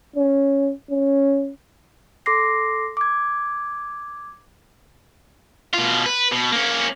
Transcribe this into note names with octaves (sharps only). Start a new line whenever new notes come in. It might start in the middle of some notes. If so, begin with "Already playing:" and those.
C#4
C#4
A4 C6 D6 A#6 C7
D6 G#6
B2 F4
B4
B2
A#3 C#4